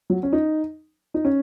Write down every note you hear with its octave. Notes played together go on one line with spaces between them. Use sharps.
F#3
C#4
D#4
D#4
C#4